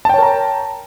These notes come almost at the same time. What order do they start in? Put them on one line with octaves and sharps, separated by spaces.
A5 G5 C#5 A#4 A#5